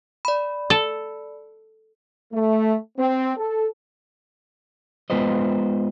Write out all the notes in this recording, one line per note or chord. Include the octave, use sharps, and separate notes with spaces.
D5 B5
A4
A3
C4
A4
G#3 B3 F4 B4 C5 D#5